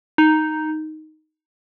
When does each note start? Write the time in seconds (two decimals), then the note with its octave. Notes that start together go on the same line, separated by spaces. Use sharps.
0.18 D#4